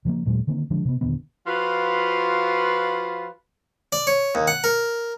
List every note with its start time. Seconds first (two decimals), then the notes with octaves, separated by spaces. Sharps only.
0.05 C#3 F3 A3 A#3
0.25 D#2 A#2 F#3 G#3
0.47 D3 D#3 A#3 C4
0.70 D3 F3 G#3 D4
0.85 C3 B3
1.01 D#1 D3 D#3 B3
1.47 F3 F4 F#4 B4
3.92 D5
4.07 C#5
4.35 D#2
4.47 F#5
4.64 A#4